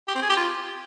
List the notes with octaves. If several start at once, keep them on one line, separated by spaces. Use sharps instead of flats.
G4
C4
G#4
G4
F4